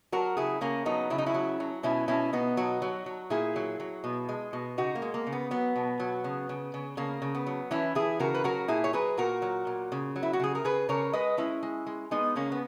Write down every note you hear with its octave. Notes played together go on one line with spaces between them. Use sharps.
F#3 F#4 A#4
C#3 E4 G#4
C#3 A#3 C#4
F#3 B3 D#4
C#3 E4
D#4
C#4 E4
F#3
F#3
B2 C#4 E4
B2 C#4 E4
B2 B3 D#4
F#3 D#4 F#4
F#3
F#3
A#2 E4 G#4
F#3
F#3
B2
G#3
B2
C#3 D#4 F#4
A#3
G#3
A#3
C#3
B3
F#3 B3
B2
F#3
C#3
C#3
C#3
C#3 A#3
C#3
B3
F#3
E3 C#4 E4
E3 E4 G#4
C#3 F#4 A#4
B4
F#3 F#4 A#4
A#2 E4 G#4
C#5
F#3 G#4 B4
A#2 F#4 A#4
F#3
A#2
C#3
F#3
E4
F#4
C#3 G#4
A#4
C#3 G#4 B4
C#3 A#4 C#5
G#3 B4 D#5
G#3 C#4 E4
G#3
G#3
G#3 B3 D#4
C#3 A#3 C#4
B3